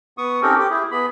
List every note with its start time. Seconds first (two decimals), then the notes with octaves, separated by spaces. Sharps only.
0.18 B3 C#6 D#6
0.42 C4 C#4 D#4 G4 A4 A#4
0.59 G4
0.70 E4 G#4
0.91 B3 G#4 B5